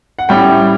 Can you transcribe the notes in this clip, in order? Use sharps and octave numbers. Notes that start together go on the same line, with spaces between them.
F#5
A2 G3 C#4 E4 G5